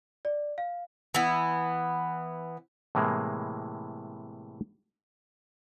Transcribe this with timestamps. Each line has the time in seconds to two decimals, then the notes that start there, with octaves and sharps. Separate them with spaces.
0.25 D5
0.58 F5
1.15 E3 B3
2.95 A2 C3 E3 G#3 A#3